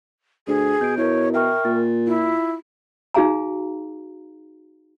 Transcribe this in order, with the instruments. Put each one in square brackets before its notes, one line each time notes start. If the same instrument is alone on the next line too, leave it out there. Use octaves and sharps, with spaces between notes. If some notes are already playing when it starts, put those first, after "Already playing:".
[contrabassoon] D2 [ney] G#4
[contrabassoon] B2 [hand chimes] G6 D7
[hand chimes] E4 A#4 [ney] C#5
[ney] A#4 [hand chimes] E5 G5 C#6
[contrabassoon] A#2 [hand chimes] A6
[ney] E4 [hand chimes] F4
[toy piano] D#4 F#4 G#4 F5 G#5 A#5